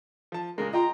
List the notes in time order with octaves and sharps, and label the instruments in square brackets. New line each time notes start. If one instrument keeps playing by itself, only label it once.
[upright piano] F3 A5
[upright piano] A#2 C#3 G#3 [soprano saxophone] A#4
[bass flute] F4 [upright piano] D#5 G5 C6 [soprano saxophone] A#5